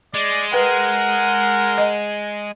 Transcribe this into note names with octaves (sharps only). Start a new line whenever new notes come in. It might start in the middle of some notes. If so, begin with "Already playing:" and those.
G#3 D5
A#4 B4 F#5 G5
D#5